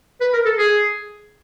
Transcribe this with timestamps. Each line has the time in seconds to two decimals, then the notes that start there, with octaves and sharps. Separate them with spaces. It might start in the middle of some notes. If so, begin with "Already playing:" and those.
0.21 B4
0.33 A#4
0.45 A4
0.58 G#4